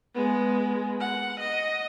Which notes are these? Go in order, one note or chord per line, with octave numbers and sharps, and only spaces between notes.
G#3 B3
F#5
D#5